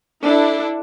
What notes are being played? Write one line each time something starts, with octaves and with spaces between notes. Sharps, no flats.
D4 E4 A4